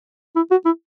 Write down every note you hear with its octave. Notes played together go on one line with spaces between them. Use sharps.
E4
F#4
E4